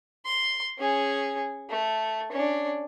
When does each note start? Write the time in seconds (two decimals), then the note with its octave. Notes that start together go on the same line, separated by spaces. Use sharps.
0.25 C6
0.78 C#4 G#4
1.69 A3
2.32 C#4 D4